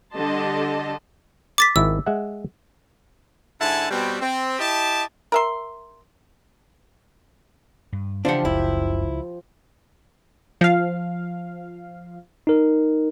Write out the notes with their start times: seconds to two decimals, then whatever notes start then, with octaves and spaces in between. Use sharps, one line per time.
0.16 D3 G3 G4 D#5 A5 C6
1.58 D6 A6 B6
1.76 G#1 D#3 E4 E6
2.06 G#3 E5 F#5
3.61 G#2 D3 E4 F#5 G#5 A5
3.91 B2 G3 C4
4.21 C4
4.59 E4 G4 D#5 A5
5.32 A#4 E5 C6
7.93 G2
8.25 C#3 E3 F3 D4 F4 G4 F#5
8.45 F#1 C#2 E4
10.61 F3 F5
12.47 D#4 A#4